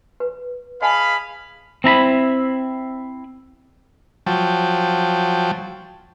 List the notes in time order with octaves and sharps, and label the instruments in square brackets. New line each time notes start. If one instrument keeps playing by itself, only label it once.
[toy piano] B4
[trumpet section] G#4 F5 B5 [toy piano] D#5 G#5 A5
[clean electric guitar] C4 E4 A#5 B5
[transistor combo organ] F3 F#3 G5 A5